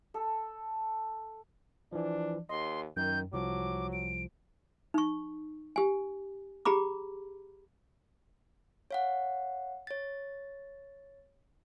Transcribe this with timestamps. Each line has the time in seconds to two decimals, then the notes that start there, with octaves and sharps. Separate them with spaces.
0.14 A4
1.93 E3 F3 D4
2.49 D#2 D#5 C6
2.97 F#2 D#3 G6
3.33 C2 F3 F#3 D6
3.93 D7
4.94 D#4 C#6
5.76 G4 G#5
6.65 G4 G#4 A#5 B5 D6
8.91 C#5 F5 F#5
9.87 C#5 A6